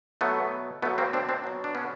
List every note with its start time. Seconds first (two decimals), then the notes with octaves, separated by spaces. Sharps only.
0.21 B2 F#3 A3 B3
0.82 B2 A3 B3
0.85 F#3
0.98 A#3 C4
1.13 C4 D4
1.29 C4 D4
1.44 B2 F#3
1.64 D4
1.75 B3 C#4